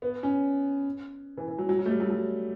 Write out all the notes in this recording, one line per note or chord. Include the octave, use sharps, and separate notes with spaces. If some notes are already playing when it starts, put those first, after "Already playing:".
B3
C#4
E3
E3
F#3
F#3
F#3
A3
G3
F#3
F#3